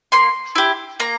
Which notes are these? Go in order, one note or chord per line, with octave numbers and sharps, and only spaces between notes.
A#3 C6
E4 G4
A#3 A#5